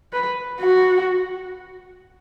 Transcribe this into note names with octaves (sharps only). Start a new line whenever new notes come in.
B4
F#4